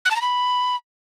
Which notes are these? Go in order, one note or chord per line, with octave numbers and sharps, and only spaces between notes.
F#6
A5
A#5
B5